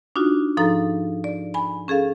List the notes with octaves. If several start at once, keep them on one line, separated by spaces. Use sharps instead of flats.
D4 D#4 F4 F#4
G#2 F3 D#4 A4 A#5 A6
D5
G#5 B5
C#4 G#4 A4 F5